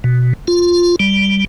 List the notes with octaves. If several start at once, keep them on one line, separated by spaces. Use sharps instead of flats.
B2
F4
G3